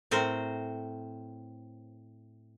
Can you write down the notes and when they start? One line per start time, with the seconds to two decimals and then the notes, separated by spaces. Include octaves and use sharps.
0.11 A2 C4 A#4 C5